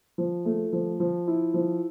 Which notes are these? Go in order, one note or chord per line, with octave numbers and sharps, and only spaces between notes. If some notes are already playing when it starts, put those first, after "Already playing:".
F3
A3
F3
F3
E4
F3